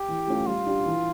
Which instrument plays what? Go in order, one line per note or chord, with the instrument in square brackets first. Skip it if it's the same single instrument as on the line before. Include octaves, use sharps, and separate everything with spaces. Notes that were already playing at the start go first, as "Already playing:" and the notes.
Already playing: [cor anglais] G4
[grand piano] E3
A3 C#4 F4
[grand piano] G3 [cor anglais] F4
[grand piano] D4 G4
E3